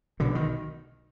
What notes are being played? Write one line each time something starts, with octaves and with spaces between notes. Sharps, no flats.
B1 B2 D3
D#3